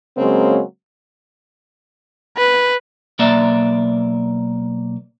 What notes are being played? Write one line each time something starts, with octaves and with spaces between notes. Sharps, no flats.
C#3 F#3 G#3 A#3 C4
B4
B1 A#3 D5 E5